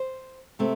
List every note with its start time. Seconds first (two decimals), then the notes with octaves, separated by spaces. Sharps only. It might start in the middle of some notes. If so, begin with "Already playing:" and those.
Already playing: C5
0.59 C3 A3 C4